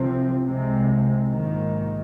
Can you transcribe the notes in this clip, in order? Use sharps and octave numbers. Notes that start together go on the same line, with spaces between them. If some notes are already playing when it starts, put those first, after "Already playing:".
Already playing: C2 C3 F3 C4
C2 C3 G#3
A#1 G#2 D#3